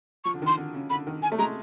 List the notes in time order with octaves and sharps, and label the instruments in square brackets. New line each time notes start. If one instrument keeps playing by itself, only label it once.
[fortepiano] F3 [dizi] C#6
[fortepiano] D3
[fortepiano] D#3 [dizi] C6
[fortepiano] D3
C#3
[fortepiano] D3 [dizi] B5
[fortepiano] D#3
[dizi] G#5
[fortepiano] A3
[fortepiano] G#3 [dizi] A#5